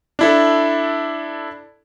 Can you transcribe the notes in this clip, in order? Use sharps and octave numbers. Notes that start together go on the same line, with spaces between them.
D4 E4 A4